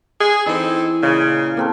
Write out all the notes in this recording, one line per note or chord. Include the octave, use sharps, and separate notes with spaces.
G#4
E3 C4 D#4 A4
A#2 C#3 D#5
A#3 C4 A4